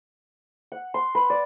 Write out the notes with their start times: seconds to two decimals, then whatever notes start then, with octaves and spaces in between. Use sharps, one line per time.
0.72 F#5
0.94 C6
1.15 B4
1.30 D5